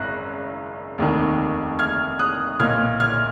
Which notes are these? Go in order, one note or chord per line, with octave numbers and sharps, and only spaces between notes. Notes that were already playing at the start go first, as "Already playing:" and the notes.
Already playing: G#1 F#2 C#3 F#6 A#6
F1 D#2 D#3
F6 G#6
D#6 F#6
B1 A#2 F6 G#6
F6 G#6